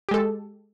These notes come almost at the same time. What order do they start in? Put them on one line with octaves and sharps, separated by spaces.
G4 G#3 A4